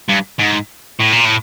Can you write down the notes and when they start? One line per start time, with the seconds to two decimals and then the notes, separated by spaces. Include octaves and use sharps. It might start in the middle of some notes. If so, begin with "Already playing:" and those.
0.09 G2
0.39 G#2
1.00 A2
1.12 A#2
1.25 A2